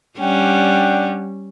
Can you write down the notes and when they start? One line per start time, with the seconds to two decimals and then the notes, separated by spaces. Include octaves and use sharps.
0.19 G3 C#4 D4 F#5 G5